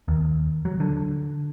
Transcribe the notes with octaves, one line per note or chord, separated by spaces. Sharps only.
D#2
F#3
D3